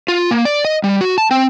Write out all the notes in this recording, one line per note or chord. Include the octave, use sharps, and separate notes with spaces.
F4
A#3
D5
D#5
G3
F#4
A5
C4